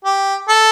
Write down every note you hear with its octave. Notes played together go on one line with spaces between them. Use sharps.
G4
A4